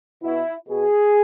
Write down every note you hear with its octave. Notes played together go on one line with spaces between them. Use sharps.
B2 E4
B2 G#4